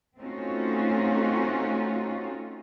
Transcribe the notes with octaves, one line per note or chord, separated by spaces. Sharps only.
A3 C4 C#4 D#4 F4 F#4